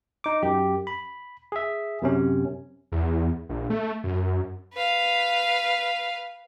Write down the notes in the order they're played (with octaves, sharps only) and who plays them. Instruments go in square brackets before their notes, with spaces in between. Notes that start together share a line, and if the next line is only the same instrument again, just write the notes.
[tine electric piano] D#4 D6
F#2 G4
B5
G#4 E5
F#2 C3 C#4
[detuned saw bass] E2
A#1
A3
F#2
[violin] B4 F5